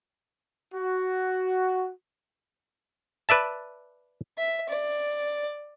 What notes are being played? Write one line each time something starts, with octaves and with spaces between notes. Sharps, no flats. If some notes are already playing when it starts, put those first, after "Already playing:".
F#4
B4 D5 E5 A5
E5
D5